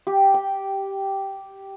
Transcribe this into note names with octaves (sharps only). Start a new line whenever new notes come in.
G4
G5